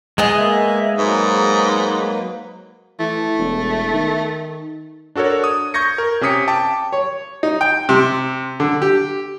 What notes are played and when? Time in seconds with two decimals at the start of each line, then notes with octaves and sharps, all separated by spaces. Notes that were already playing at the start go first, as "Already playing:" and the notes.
0.18 G#3 B3 G#4 D#5
0.36 A#3 E5
0.98 G#2 F#3 A#3 B4
3.00 E3 A3
3.39 E1
3.94 D#3
5.15 D4 F#4 A4 A#4 C#5
5.44 D#6
5.74 C#6 G6 G#6 A#6 C#7
5.98 A#4
6.21 C3 C#4 G4 D#6 B6 C#7
6.47 G5 A5 D6
6.93 C#5
7.43 D#4
7.61 G5
7.89 C3
8.60 D3
8.82 G4